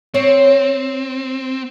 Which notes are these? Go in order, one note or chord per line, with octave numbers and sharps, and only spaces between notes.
C4 C#5